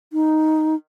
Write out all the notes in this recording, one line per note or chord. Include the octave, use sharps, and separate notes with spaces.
D#4